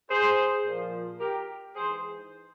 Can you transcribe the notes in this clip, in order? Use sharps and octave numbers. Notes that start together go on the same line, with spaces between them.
G#4 C5
A#2 F3
G4 A#4
G#2 E3 G#4 C5